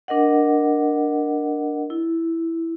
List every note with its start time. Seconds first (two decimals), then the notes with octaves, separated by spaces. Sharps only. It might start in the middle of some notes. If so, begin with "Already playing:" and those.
0.08 D4 A#4 D#5 F#5
1.90 E4